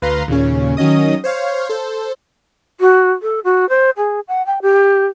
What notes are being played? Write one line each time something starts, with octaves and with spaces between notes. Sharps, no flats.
D2 B4 F5 A#5 C6
D#2 A#2 C#3 C#4
D#3 F#3 C#4 D#5 D#6
C5 C#5 F5
A4 C5
F#4
A4
F#4
C5
G#4
F#5
G5
G4